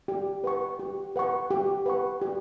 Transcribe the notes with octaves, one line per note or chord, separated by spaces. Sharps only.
G4
B4 F#5 C#6
G4
B4 F#5 C#6
G4
B4 F#5 C#6
G4